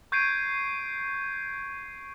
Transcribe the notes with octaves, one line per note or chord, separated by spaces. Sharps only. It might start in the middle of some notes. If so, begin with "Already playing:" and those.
C#6 G6 G#6 C7 D7 D#7